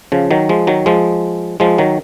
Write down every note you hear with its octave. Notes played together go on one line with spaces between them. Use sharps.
C#3 F3
D#3 F#3
F3 G#3
D#3 F#3
F3 G#3
F3 G#3
D#3 F#3